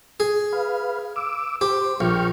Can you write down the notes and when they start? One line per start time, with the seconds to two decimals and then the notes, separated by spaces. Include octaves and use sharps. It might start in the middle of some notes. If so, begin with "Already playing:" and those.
0.20 G#4
0.53 B4 F5
1.16 D6 E6
1.61 G4 C5
2.00 A#1 G5 C#6 F6